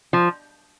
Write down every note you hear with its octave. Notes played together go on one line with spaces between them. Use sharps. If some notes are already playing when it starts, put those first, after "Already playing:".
F3